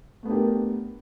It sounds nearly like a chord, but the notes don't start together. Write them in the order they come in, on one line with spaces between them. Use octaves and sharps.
A3 B3 D4 G4 A#4